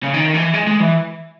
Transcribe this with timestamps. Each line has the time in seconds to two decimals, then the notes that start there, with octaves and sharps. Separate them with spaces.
0.03 C#3
0.14 D#3
0.34 E3
0.54 G#3
0.67 G#3
0.80 E3